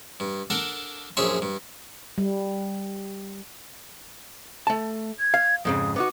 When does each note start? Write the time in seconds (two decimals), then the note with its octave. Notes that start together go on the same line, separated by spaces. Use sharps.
0.20 G2
0.50 D4 A4 A#4 F#5
1.17 A#1 F#2 G#4 C#5 E5 C6
1.42 G2
2.18 G3
4.67 A3 A5
5.20 G#6
5.34 F5
5.65 F2 G#2 C#3 D#6
5.96 B3 D#4 F#4 D6